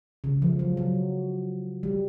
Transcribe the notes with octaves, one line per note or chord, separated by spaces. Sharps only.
C#3
F3
F#3
F#3
G3